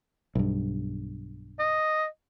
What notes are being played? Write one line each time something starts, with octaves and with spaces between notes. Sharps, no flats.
B1 G2
D#5